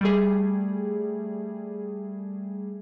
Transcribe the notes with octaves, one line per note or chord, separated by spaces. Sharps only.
G3 A3 G#4